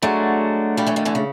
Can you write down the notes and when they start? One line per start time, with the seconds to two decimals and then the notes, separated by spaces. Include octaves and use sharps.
0.02 F#3 G#3 A3 D4 F#4
0.77 F3 G3
0.86 E3 F#3
0.96 D#3 F3
1.05 D3 E3
1.15 C#3